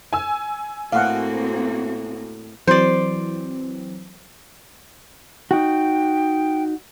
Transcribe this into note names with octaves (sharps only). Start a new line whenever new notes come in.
G#5 E6
A2 A#3 C4 F#4 F5 F#5
E3 F#3 C4 C5 D5
D#4 F#4 G5